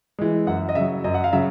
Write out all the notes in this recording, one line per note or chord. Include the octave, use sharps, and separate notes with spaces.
E3 G#3
F#2 F#5
D#5
C#3 F#3 E5
F#2 D#5
F#5
F5
C#3 F#3 E5